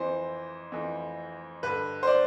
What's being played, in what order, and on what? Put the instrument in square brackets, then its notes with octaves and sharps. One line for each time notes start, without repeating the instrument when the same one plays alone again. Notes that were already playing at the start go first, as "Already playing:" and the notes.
Already playing: [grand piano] F2 E3 C5
F2 E3
G2 D3 B4
C5
D5